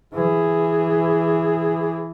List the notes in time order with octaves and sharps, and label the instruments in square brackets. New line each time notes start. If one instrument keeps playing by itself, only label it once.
[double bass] E3 [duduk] G#4